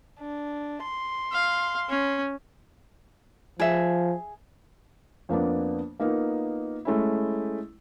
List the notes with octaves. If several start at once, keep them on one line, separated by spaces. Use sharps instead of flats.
D4
C6
F5
C#4
F3 G#4 E5
F2 A#3 B3 D4
A#3 B3 D#4 F4 F5
G#3 A3 C#4 E4